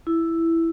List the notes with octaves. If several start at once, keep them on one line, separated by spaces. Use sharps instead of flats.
E4